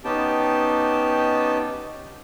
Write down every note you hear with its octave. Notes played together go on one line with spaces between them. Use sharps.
B3 C#4 D#4 G4 G5 A5